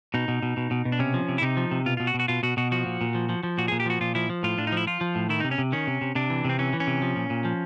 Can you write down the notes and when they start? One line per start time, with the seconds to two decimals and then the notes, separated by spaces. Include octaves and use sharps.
0.14 B2 D#4
0.28 B2
0.42 B2
0.57 B2
0.71 B2
0.85 B2
0.92 D4
0.99 C3 C#4
1.14 F3
1.29 C3
1.38 E4
1.42 C3 D#4
1.57 F3
1.71 C3
1.86 B2 F4
1.97 B2 F4
2.07 F#4
2.14 B2
2.20 F#4
2.28 B2 F4
2.43 B2 F#4
2.57 B2 F#4
2.72 F3 F#4
2.86 A#2
3.01 A#2
3.15 F3
3.29 F3
3.43 F3
3.58 A#2 F#4
3.68 A#2 G#4
3.80 G4
3.86 F3 F#4
4.01 A#2 F4
4.15 F3 E4
4.30 F3
4.43 A2 F4
4.58 A2 D4
4.67 D#4
4.72 F3 E4
4.87 F3 F4
5.01 F3
5.15 A2
5.29 D#3 E4
5.40 C3 D#4
5.51 C#4
5.58 C3
5.72 D#3 C#4
5.87 C3
6.01 C3
6.15 C3 D4
6.30 E3
6.45 C3 C4
6.59 E3 C#4
6.73 E3
6.80 C#4
6.87 C3
7.02 F3
7.16 A#2
7.30 A#2
7.45 F3